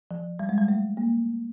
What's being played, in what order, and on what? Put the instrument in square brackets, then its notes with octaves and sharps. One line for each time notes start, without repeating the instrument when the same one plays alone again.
[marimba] F3
G3
G#3
G3
A3
A#3